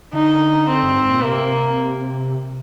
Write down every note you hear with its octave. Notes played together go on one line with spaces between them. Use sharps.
D3 D#4
C4
G2
G#2
A#2
C3 A#3